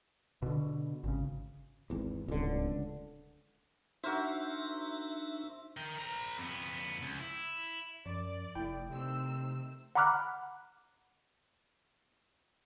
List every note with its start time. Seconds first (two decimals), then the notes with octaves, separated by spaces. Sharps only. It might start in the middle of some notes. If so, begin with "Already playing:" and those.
0.42 B2 D3
1.04 G#1 C#3
1.90 G#1 E2
2.28 D1 C#2 D3
4.04 D4 D#4 F#4 A#4 C5 E5
5.77 A#4 G5
5.99 B4 A#5
6.38 F2 B3
7.02 C#2
7.20 E4
8.05 F#2 F3 D5
8.55 F1 A3 E4 G5
8.90 C3 D#3 C4 E6
9.95 F#5 A#5 B5 D6 F6 F#6